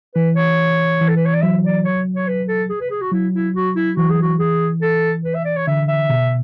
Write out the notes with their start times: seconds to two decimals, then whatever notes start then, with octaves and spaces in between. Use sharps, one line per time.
0.15 E3 B4
0.36 C#5
1.01 E3
1.08 A4
1.17 B4
1.26 C#5
1.33 D5
1.42 F#3 E5
1.65 D5
1.85 C#5
2.16 C#5
2.28 B4
2.48 A4
2.70 G#4
2.81 B4
2.91 G#4
3.01 F#4
3.12 F#3 E4
3.34 E4
3.55 F#4
3.76 E4
3.97 E3 F#4
4.10 G#4
4.22 F#4
4.39 G#4
4.82 A4
5.25 B4
5.35 E5
5.45 D5
5.56 C#5
5.67 D3 E5
5.88 E5
6.10 B2